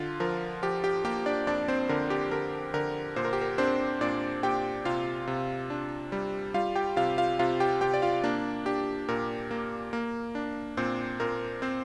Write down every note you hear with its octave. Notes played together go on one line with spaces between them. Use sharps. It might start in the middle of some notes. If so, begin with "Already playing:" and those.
Already playing: D3 F4
F3 A#4
F3 G4
G4 G5
A#3 G4 G5
D4 D5
F2 D4 D5
C4 C5
D3 A#4
G4
D3 A#4
D3 A#4
A#2 C5
A#4
G4
A#4
C4 D4 C5
A#2 D4 D5
A#2 G4 G5
C3 F4 F5
C3
D4
G3
G3 F4 F5
G4 G5
C3 F4 F5
F4 F5
C3 F4 F5
G4 G5
C3 G4 G5
D5
F4 F5
A#3 D4 D5
D4 G4
A#2 A#4
A#3
A#3
D4
A#2 C4 C5
A#2 A#4
C4 C5